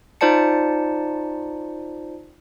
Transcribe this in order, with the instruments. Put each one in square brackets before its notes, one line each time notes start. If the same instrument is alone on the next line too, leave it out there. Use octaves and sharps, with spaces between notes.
[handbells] D#4 F4 C5 D5 A5 C#7